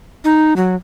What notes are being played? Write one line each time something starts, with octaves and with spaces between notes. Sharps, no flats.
D#4
F#3